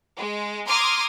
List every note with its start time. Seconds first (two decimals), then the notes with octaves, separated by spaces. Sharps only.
0.18 G#3
0.67 A#5 C6 D6 D#6 F6 G#6